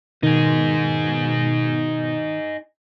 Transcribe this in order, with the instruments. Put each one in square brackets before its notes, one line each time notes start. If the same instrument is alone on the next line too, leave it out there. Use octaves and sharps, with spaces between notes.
[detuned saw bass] B2 [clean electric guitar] D#3 [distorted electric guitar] D#4 G#4